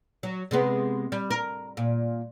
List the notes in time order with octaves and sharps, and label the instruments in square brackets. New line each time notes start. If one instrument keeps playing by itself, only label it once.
[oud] F#3
C3 G#3 B3
G3
A#4
A#2